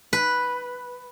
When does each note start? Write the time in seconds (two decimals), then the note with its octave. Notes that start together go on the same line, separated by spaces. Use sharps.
0.13 B4